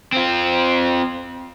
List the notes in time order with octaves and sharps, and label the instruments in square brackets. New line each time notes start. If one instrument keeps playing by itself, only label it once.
[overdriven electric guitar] C4 F4